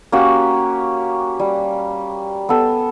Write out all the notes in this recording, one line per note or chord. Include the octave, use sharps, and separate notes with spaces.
A#3 C#4 F#4 G4
G3
B3 A4